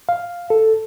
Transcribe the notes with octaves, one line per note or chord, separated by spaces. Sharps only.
F5
A4